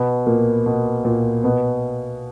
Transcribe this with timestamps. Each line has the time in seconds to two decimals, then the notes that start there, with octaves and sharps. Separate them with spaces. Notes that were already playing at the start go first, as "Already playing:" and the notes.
Already playing: B2 B3
0.26 A#2 A#3
0.66 B2 B3
1.05 A#2 A#3
1.44 B2 B3